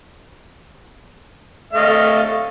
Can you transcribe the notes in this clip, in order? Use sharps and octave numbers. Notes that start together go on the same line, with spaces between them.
A3 D#5 F5